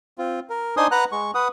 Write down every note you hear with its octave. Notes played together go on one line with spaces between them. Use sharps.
C4 F4
A#4
D4 D#4 C5 G#5 C6 D#6
B4 F#5 A#5 F#6
G#3 C#6
B4 F#5 D#6